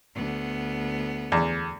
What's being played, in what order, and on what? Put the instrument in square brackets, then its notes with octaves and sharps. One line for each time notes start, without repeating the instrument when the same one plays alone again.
[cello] D2 B3
[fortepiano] E2